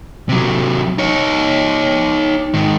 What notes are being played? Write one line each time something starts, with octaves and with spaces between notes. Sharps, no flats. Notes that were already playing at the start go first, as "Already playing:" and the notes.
C3 F#3
D#4 C#5
G#2 D#3